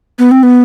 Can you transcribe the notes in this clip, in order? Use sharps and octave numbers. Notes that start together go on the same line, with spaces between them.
B3
C4
B3